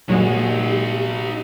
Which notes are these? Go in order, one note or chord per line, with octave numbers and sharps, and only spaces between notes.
A#2 F#3 G#3 D#4 F#4 G4